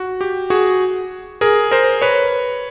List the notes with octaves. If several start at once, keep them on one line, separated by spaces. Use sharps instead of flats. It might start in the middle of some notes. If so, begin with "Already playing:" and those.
Already playing: F#4
G4
F#4 G#4
G#4 A#4
A#4 C5
B4 C#5